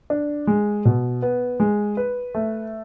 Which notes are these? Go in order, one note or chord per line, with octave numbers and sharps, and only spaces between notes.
D4
G#3
B2
B3
G#3
B4
A3